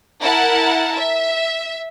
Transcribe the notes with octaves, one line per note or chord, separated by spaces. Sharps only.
E4 A#4 F#5 A5
E5